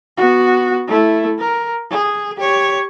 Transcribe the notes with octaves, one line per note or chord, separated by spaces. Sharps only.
B3 F#4
A3 E4
A#4
G#4
G4 C#5